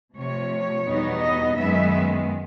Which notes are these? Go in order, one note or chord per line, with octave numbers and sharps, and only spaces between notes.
C3 F3 A3 C#5
E2 B2 G3 B3 D#4
D#5
F#2 D#3 G#3 B3 E5